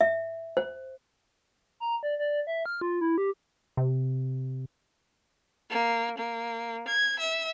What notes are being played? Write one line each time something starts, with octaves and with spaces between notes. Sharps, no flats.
E5
C5
A#5
D5
D5
E5
F6
F4
E4
G4
C3
A#3
A#3
G#6
E5